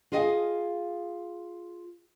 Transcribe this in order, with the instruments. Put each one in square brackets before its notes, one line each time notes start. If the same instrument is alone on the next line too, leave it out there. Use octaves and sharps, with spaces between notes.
[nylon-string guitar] F4 G#4 D#5 F5 G5 G#5